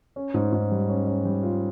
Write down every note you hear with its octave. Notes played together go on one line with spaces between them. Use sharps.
C#4
G#2
G#2
G3
C#4
C#4
G3
F4